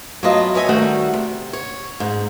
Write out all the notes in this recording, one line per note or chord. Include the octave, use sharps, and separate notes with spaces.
F#3 A3 B3 F4 D#5
A#4 B4 C#5 D#5 E5 G#5
D#3 G3 A3 F#4
C3
C#5
G#2